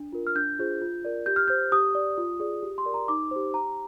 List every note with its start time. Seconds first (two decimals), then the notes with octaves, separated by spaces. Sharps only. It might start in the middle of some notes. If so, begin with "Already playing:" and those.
Already playing: D4
0.13 F4 A#4
0.27 F6
0.36 D4 G6
0.59 F4 G#4 C5
0.81 F4
1.05 A#4 D5
1.26 G4 G6
1.36 F6
1.48 C5 G6
1.72 G4 D#6
1.95 D5
2.18 F4
2.40 G#4 D5
2.63 G4
2.78 C6
2.86 A#4 D5
2.94 A#5
3.08 D#4 D6
3.31 G4 C5
3.54 G4 A#5